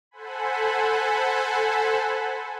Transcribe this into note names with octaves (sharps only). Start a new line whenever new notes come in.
A4 C5 F#5 G#5 B5